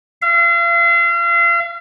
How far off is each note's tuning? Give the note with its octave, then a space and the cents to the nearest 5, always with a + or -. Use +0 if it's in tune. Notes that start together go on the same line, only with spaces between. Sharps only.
F5 -40